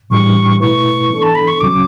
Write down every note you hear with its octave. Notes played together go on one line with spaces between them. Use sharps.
A2 E3 G3 D4 G4 C#6
B2 A3 E4 B4 C#6
E3 B3 D4 A4
A5
B5
C#6
C#2 C#3 F#3 C#4 D6